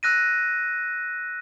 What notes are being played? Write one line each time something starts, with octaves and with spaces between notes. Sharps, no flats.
E6 F#6 A#6 D#7